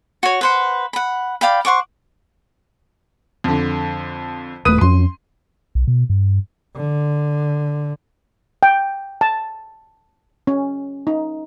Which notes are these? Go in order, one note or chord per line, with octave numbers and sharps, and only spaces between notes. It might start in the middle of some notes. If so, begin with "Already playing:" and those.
F#4 C#5
B4 C5 F#5
F#5 B5
D5 F5 G5 B5
C5 F#5 C#6 D6
F2 D3
D#1 A3 B4 D#6 D#7
F2 C#4 C6
B1
B2
G2
D3
G5
A5
C#4
D#4